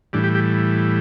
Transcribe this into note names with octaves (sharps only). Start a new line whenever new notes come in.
A2 E3 G3 D4
G4
G4